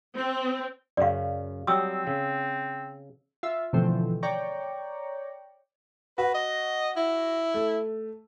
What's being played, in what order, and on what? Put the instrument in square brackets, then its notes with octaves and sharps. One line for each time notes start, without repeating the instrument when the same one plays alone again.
[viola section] C4
[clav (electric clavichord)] F#2 C#3 [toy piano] D5 F5
[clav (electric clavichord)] F#3 G3 G5 [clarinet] C4 [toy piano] D#6 E6
[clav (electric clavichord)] C#3
[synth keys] F4 E5
B2 D3 E3 F3 A3 C4
C#5 D5 G5 A#5 C#6
[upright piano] F#4 [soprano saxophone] B4
[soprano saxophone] D#5
E4
[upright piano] A3